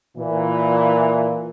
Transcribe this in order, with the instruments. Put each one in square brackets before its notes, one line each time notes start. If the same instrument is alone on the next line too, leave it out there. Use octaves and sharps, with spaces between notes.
[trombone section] A#2 E3